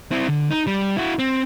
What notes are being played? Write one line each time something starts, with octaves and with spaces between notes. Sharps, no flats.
C4 E4
D3
D#4
G3
E4 F#4
C4